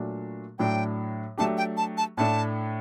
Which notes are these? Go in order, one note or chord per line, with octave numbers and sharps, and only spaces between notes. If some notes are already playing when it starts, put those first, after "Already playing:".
Already playing: A#2 F#3 A3 D4 F#4
A2 F#3 A3 D4 G5
F#3 A3 D4 G4 A5
G5
A5
A5
A2 A3 D4 A5